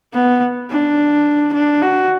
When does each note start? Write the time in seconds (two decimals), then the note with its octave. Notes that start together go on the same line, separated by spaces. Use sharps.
0.14 B3
0.70 D4
1.54 D4
1.82 F#4